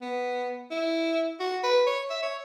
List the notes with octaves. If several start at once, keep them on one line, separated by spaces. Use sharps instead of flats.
B3
E4
F#4
B4
C#5
E5
C#5